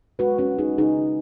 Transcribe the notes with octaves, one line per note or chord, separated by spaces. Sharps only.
G#3 F#4 B4
C#4 F#4
G#3
D#4 G#4
C#3 D#4 G#4